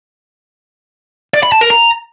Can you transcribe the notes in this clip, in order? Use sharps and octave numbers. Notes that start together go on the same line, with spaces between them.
D5
B5
A5
A#4
A#5